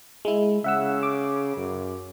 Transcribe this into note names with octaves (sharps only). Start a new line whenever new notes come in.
G#3 E4
C#3 E5 F#5 E6
D6
F#2